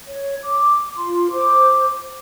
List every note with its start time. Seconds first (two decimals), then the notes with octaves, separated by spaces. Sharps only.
0.08 C#5
0.43 D6
0.96 F4 C6
1.31 C5 D6